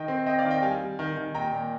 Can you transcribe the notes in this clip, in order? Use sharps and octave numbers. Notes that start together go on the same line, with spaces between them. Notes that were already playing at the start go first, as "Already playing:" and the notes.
Already playing: D#3 D#5 G5
C4
C4 D#5 G5
D5 F5
D#3
D#5 G5
G3 F5 G#5
G3
D#3
D#3
A#2 G5 A#5
A#2